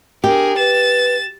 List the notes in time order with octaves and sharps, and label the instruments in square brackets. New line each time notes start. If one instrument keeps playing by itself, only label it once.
[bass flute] D4 [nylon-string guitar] G4 [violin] G#4 A#4
[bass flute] B4 [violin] A6 E7